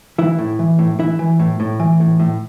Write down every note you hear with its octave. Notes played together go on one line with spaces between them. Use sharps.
E3 E4 E5
A2
E3
A2
E3 E4 E5
E3
A2
A2
E3
A2
A2